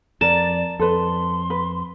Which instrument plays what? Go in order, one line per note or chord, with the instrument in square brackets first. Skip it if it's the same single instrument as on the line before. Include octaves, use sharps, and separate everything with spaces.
[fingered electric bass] F2 [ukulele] A#4 [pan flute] D5 [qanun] A5
[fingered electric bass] F2 [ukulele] A4 B4 [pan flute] C6
[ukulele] B4